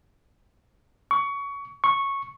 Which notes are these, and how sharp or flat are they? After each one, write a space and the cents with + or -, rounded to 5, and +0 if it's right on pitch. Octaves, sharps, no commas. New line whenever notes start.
C#6 +20
C#6 -10